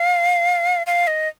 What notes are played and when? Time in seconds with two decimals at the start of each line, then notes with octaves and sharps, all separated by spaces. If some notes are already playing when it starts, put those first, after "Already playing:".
Already playing: F5
0.87 F5
1.07 D#5